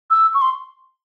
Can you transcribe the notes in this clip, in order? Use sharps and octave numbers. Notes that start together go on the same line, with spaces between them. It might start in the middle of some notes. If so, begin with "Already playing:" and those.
E6
C#6
C6